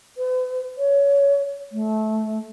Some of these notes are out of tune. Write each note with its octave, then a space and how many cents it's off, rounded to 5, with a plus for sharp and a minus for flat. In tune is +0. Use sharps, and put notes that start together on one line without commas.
B4 +45
C#5 +20
A3 -20